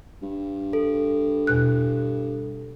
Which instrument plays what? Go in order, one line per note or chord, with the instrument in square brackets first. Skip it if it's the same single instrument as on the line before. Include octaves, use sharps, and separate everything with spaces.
[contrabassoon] G2
[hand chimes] A4
[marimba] E2 B2 F#6